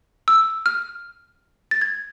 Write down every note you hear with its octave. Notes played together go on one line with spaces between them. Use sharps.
E6
F6
A6
G#6